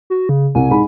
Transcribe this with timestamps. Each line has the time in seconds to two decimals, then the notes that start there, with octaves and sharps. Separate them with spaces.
0.10 F#4
0.29 C#3
0.55 C2 G#5
0.70 G#2 B5